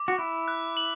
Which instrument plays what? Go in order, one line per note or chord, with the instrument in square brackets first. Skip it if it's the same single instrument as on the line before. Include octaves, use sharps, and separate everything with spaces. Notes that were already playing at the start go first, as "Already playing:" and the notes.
Already playing: [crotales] D6
[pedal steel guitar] F#4
[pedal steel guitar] E4 [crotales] F#6
[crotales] F#6
F#7